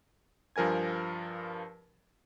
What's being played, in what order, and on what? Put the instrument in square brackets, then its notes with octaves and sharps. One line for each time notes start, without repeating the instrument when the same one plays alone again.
[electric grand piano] G2 F3 A#4 G#5 G#6